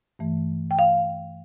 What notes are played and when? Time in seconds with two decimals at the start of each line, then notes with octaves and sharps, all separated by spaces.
0.19 G2 E3 A3
0.71 G5
0.79 F5